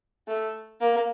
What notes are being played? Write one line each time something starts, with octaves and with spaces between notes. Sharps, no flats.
A3
A#3